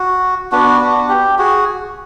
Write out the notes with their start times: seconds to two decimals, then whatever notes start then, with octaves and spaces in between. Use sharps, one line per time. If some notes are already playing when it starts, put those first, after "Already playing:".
Already playing: F#4
0.52 B3 D4 F#4
0.81 F#4
1.09 G4
1.38 F#4 G#4